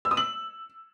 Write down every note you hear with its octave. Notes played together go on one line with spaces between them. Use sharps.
E6
D#6
F#7